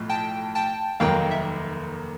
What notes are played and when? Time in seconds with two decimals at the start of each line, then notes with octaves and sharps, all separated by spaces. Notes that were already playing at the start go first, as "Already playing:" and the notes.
Already playing: B1 A2 F3
0.09 G5 A5
0.55 G5 A5
1.00 F1 D#2 D#3 F#3 F5 G5
1.31 E5